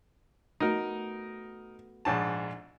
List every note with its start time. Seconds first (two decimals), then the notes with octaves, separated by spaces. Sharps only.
0.60 A3 B3 D#4 F#4 A#4
2.05 A#1 G#2 A5